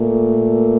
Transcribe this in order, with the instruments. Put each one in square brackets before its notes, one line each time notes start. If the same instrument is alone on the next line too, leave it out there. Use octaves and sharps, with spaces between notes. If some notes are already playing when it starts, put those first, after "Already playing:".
Already playing: [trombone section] A#2 A3